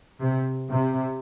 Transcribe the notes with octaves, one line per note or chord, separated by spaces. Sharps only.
C3
C3